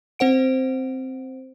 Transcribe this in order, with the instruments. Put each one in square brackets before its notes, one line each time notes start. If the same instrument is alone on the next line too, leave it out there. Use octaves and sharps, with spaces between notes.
[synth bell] C4 C5 F#5 D7